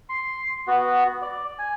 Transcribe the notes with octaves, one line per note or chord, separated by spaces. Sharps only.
C6
B3 F#4
D5
G#5